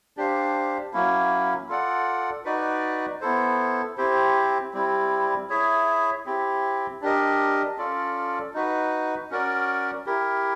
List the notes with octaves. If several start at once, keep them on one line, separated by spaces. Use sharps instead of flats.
D4 G4 C5 F5
F#3 A#3 C#4 E4
F4 A4 D5 F#5
D#4 F#4 B4 D5
B3 E4 A4 C5
C4 E4 G4 C5
G3 C4 E4
E4 G#4 C#5 E5
C4 E4 G4
D4 G4 A#4 D#5
C#4 F4 A4 D5
D#4 F#4 B4
C#4 F#4 A#4 D5
E4 G4 A#4